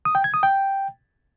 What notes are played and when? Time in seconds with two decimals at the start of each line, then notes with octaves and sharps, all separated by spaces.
0.05 D#6
0.15 G5
0.24 G#6
0.34 D#6
0.43 G5